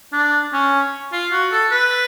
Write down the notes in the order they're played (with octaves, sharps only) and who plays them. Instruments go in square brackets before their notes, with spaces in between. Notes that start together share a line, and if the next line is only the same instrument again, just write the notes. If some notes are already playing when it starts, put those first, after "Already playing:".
[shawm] D4
C#4
F4
F#4
A4
B4